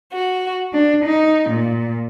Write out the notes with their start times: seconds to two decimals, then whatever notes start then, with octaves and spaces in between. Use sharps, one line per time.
0.12 F#4
0.73 D4
1.05 D#4
1.50 A#2